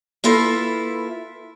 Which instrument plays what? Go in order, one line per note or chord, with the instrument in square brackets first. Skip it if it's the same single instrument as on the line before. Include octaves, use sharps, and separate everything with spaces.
[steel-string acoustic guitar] A#3 E4 F4 A4 B4